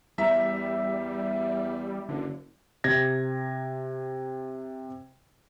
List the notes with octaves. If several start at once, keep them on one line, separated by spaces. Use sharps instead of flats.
E2 G3 E5 A#5
F#1 D3
C3 G#6 A#6